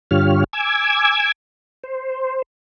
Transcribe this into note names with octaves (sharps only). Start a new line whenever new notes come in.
G2 D3 F4 G4 C#5 F6
G#5 D6 E6 G#6
C5